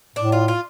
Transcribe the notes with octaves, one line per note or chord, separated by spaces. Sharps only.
A2 D4
F4
F4